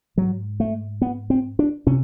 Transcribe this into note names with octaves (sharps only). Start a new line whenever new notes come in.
G#2 F#3
A3
B3
C4
D4
C3 C#4